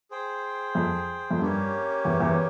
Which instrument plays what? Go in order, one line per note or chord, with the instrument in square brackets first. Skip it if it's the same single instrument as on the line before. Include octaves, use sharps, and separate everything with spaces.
[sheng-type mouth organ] G#4 C5 G5
[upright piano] F2
F2
[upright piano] G2 [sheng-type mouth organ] A#3 C#4 G4 C#5
[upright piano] E2
E2